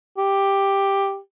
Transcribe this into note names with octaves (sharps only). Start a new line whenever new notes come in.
G4